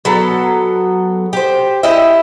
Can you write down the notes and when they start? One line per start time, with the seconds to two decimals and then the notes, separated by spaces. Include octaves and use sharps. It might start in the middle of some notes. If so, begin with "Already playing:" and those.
0.05 F#3 B3 A4
1.33 G4 C5
1.83 E4 G4 D#5 E5